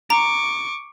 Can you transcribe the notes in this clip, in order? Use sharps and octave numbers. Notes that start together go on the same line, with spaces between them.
A#5 C#6 D6